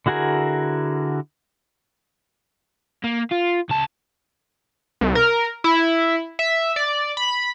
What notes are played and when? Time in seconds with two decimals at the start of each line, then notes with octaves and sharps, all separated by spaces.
0.06 D3 E4 F#4 G#4 A#4
3.04 A#3
3.32 F4
3.70 C#2 A5
5.01 C2
5.15 A#4
5.64 E4
6.39 E5
6.76 D5
7.17 B5